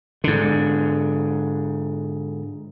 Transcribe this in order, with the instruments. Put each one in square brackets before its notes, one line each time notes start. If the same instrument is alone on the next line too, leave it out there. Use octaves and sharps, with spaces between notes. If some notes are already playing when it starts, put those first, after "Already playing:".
[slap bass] G#2 D3